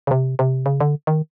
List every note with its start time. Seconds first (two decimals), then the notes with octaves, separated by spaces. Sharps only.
0.07 C#3
0.11 C3
0.39 C3
0.66 C#3
0.80 D3
1.07 D#3